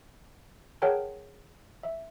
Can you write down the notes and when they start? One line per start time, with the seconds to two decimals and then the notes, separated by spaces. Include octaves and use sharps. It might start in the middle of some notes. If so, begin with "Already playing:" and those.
0.82 G#4 A#4 C#5 F#5 G5 A5
1.83 E5